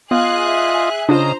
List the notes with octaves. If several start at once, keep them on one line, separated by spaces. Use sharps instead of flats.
B3 F4 G#4 D#5 F5 G#5 F#6
E5
C#3 D4 F4 C5 D#5 A#5